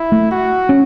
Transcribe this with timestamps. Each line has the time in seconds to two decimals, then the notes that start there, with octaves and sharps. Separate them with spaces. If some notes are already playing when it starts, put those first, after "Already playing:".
Already playing: E4
0.12 A3
0.31 F#4
0.69 C#4